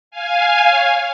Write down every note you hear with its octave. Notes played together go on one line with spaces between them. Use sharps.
F5 G#5
C#5 F5